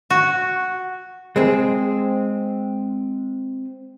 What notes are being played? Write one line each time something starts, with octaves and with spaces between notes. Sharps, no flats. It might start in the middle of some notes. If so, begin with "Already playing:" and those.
F#4
G#3 C4 G#4